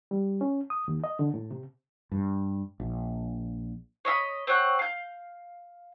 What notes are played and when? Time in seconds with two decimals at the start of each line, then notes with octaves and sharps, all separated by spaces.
0.11 G3
0.41 C#4
0.70 D#6
0.88 D#2
1.04 D#5
1.19 D3
1.34 A2
1.51 C3
2.12 G2
2.80 A#1
4.05 C#5 D#5 E5 B5
4.47 C4 C#5 F#5 C#6
4.79 F5 G6